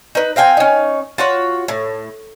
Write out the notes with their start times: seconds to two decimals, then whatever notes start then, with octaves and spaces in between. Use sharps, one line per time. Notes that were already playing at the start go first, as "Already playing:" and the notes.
0.15 D#4 B4
0.36 C4 F5 G5 G#5
0.57 C#4 D#4
1.18 F4 F#4 C#5
1.68 A2